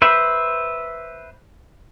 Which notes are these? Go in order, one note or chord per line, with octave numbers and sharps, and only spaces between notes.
B4 C5 E5